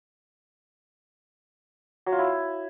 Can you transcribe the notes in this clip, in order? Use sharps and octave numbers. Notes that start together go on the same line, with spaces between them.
F#3
F4
E4